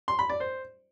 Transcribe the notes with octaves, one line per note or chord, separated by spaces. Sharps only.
C6
B5
D5
C5